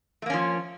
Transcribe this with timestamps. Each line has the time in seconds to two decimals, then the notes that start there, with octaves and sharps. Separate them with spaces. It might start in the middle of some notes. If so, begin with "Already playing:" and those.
0.22 A3
0.26 A#3
0.30 C#4
0.33 F3